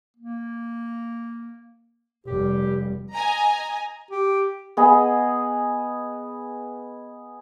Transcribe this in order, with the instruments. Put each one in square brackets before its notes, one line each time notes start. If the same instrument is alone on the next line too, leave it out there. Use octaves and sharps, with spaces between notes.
[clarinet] A#3
[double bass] F1 G3 [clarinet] G4
[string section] D#5 G#5 A#5
[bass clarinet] G4
[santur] B3 G#4 D#5